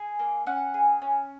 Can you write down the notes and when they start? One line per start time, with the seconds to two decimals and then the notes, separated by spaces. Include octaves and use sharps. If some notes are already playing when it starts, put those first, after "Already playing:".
Already playing: G#4 G#5
0.19 A#3
0.46 C#4 F#5
0.74 G#4
1.02 C#4